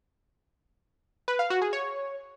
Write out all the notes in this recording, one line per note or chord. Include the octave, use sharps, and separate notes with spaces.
B4
F5
F#4
G#4
C#5